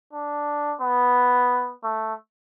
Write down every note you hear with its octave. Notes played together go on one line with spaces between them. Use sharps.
D4
B3
A3